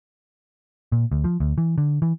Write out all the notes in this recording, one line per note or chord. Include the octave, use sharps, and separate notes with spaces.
A#2
D2
F3
D2
E3
D3
E3